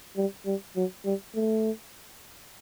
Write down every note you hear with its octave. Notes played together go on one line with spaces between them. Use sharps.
G3
G3
F#3
G3
A3